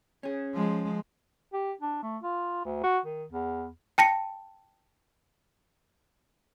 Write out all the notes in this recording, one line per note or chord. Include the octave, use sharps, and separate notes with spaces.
C#4 G#4
F3 G#3
G4
D4
A3
F4
D2
F#4
D#3
E2
G5 A5 A#6 C#7